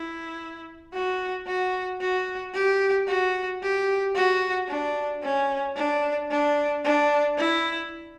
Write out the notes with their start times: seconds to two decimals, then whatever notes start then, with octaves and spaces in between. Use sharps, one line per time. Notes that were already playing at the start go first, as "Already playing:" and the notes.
Already playing: E4
0.94 F#4
1.47 F#4
2.01 F#4
2.54 G4
3.08 F#4
3.62 G4
4.15 F#4
4.68 D4
5.23 C#4
5.76 D4
6.31 D4
6.84 D4
7.38 E4